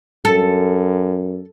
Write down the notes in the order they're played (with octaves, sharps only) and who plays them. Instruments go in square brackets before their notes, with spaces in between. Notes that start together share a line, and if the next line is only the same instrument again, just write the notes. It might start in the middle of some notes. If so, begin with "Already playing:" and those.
[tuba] F#2 [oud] A4